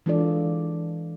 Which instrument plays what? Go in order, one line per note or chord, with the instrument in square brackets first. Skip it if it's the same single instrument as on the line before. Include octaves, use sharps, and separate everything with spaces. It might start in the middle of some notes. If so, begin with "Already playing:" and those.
[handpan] E3 G#3 D4 F4 A4 D5